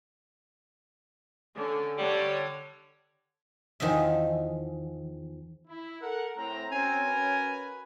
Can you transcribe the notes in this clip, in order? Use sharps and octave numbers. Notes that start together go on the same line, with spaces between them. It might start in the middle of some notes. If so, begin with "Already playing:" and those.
D3 C#4
D3 G3 C#5
E2 D#3 F3 D#5 E5
E4
A4 A#4 F#5
A2 C4 A#5
C4 C#4 F#4 A#4 G#5
B4